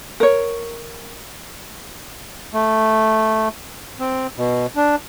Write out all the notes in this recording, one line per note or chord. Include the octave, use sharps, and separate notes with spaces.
A#4 C#5
A3
C4
B2
D4